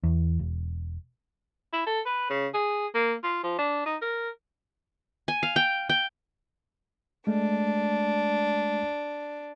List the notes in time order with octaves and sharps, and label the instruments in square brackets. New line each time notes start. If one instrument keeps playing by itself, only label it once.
[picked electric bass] E2
E1
[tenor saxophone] E4
A4
B4
C#3
G#4
A#3
F4
F3
D4
D#4
A#4
[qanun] G#5
F5
G5
G5
[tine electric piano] G#3 A3 [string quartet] D4